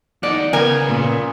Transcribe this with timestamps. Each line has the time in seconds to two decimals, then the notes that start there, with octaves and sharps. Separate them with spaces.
0.23 E2 D#4 D5 F#5
0.53 C#3 B3 A#4 G#5
0.88 A#2